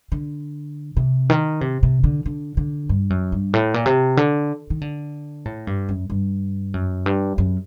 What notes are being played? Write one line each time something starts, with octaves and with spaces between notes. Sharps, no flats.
D3
C3
D#3
C3
C3
D3
D3
D3
G2
F#2
G2
A2
A#2
C3
D3
D#3
D3
A2
G2
F#2
G2
F#2
G2
F#2